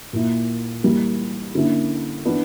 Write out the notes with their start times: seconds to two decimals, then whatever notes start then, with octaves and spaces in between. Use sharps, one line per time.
0.13 A#2 A#3 E4
0.83 E3 G3 A#3
1.55 D3 A#3 C#4 E4
2.25 E3 B3 D4